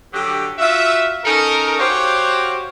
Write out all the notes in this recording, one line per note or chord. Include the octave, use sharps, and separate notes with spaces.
D3 F#3 G4
F4 F#4 E5
C#4 D#4 A4 A#4
F#4 G4 C5 C#5 F5